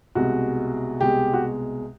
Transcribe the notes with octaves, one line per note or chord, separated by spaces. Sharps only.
C2 B2 G#3 F#4
C2 B2 G#3 G4
F#4